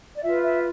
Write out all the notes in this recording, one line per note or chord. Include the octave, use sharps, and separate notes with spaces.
D5
F4 B4 E5
E5